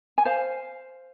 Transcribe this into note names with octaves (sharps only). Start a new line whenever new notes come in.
G#5
C5 F5